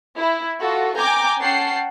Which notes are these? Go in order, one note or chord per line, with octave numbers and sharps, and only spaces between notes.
E4
F4 F#4 A4
G5 G#5 A#5 D6 G6
C#4 F#5 G5 A5 C7